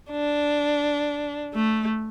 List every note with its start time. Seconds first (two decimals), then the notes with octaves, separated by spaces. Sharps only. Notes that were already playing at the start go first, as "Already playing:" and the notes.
0.11 D4
1.54 A3